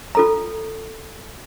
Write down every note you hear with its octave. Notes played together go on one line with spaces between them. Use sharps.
F4 A4 A#5